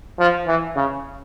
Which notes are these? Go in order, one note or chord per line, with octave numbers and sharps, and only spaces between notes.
F3
E3
C#3